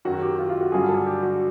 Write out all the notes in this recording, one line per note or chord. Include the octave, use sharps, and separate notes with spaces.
F#2 D#3 F#3 F#4
G4
F4
F4
F#4
G2 D3 F#3 G#4
A4
G4
F#4